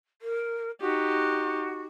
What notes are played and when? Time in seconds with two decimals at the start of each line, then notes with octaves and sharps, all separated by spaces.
0.22 A#4
0.80 D#4 F#4 G4